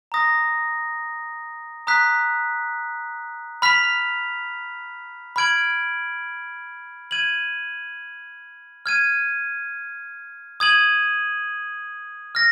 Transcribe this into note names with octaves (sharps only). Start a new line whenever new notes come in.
A#5 D#6 A#6
A#5 D#6 F#6 B6
B5 F6 B6 F7
B5 F6 G#6 D7 F#7
F6 G#6 D#7 F#7
F6 G#6 D#7
D#6 G#6 D#7 F#7
F6 A#6